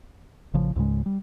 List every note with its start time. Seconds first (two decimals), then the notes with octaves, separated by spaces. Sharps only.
0.54 A1 C#3 F3
0.76 C#2 G#2 C#3 G#3
1.06 G3